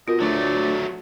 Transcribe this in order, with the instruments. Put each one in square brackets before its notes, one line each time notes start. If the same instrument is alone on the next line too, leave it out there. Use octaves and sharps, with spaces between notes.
[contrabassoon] B2 [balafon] F4 A#4 [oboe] D#5
[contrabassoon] D2 [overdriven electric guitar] F#3 A3 [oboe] D5